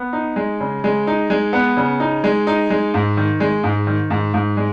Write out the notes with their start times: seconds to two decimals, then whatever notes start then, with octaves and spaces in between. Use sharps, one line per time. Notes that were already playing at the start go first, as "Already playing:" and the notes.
Already playing: B3
0.13 D#4
0.36 G#3
0.60 C#3
0.84 G#3
1.07 D#4
1.30 G#3
1.53 B3
1.77 C#3
2.00 D#4
2.24 G#3
2.47 D#4
2.70 G#3
2.94 G#2
3.17 D#3
3.40 G#3
3.64 G#2
3.87 D#3
4.10 G#2
4.34 G#2
4.57 G#3